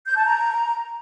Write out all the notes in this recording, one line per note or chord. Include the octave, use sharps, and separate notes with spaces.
G6
A5
A#5